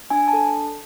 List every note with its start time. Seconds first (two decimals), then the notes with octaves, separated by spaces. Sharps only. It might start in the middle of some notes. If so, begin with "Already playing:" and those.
0.10 D4 G#5
0.28 A5
0.33 A4